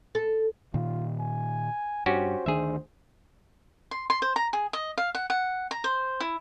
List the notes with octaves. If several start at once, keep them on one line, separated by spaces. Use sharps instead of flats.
A4
A#2 D#3 F4
G#5
G2 C#4 F#4 G4 C5
D2 D#3 D4 G#4 E5
C6
C6
C5
A#5
G#4
D#5
F5
F#5
F#5
A#5
C5
E4